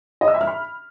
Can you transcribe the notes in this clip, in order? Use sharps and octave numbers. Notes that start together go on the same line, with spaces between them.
D#5
E6
E5
F6
B5